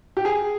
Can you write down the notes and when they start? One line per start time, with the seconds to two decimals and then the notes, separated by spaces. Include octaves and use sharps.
0.17 G4
0.25 G#4